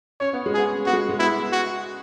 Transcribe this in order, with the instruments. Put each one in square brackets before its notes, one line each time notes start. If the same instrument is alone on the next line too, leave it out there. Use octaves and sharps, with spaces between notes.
[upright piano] C#4 [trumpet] C#5
[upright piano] B3
G#3
[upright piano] B3 [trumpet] G#4
[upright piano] B3 [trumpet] F#4
[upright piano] G#3
G#3
[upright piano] B3 [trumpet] E4
[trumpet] F#4